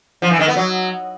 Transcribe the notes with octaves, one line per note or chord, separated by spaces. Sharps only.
F3
E3
D#3
B3
F#3